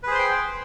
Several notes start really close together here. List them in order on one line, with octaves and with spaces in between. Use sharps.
B4 G#4 C5 C6 G5